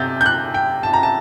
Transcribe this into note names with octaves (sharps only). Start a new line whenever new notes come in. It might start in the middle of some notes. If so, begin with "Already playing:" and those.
Already playing: C3 G6 A6
G6
F#6
G5
A5
A#5
A5